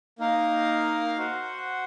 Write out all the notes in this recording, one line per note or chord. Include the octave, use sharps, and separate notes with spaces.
A#3 D#4 A#4 F5
F#4 C5 F#5